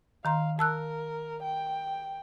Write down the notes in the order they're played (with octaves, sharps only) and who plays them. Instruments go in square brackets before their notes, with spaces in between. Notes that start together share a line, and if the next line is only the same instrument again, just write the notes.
[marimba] D#3 A#5 C6 [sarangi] F5
[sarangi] A#4 [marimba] A5 E6 F#6
[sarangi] G5